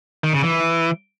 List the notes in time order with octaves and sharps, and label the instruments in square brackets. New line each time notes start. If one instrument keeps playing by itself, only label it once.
[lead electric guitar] D#3
C#3
E3